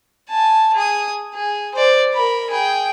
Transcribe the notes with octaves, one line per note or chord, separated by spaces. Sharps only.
G#5 A5
G#4 D#6
G#4
C5 D5
A#4 B5
G#4 G5